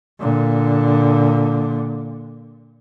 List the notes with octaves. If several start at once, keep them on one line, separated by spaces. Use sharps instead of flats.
A#2 D3